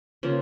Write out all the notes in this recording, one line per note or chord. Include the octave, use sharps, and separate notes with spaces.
C#3 F3 A#3